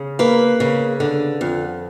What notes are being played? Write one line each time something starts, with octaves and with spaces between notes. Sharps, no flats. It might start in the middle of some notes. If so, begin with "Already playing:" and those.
Already playing: C#3
A#3 B4
C#3
D3
F2